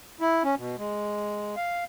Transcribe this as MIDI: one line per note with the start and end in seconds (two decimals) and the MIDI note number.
0.21 0.43 64
0.44 0.55 61
0.58 0.76 47
0.78 1.55 56
1.56 1.84 77